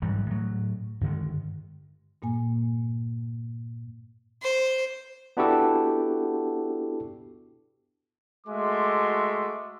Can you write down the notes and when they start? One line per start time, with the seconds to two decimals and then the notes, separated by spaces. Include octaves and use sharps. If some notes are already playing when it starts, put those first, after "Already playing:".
0.02 G#2 E3 F#3 G3
0.26 A2 F#3
1.01 G2 D3 D#3 G#3
2.22 G2 A#2 A#3 G#5
4.43 C5
5.37 B3 D4 E4 F#4 G4 A4
8.47 G#3 A3 F#4 E5 C6 D6